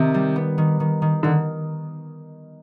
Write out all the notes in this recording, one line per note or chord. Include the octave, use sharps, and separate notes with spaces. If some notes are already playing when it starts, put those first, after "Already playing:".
Already playing: C3 D#3
G3
B3
D#3
D#3
D#3
D3 D#3